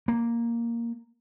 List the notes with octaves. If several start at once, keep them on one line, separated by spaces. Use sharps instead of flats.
A#3